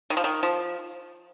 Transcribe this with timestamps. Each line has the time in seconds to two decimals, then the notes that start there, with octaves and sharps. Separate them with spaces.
0.10 D#3
0.17 F3
0.24 D#3
0.43 F3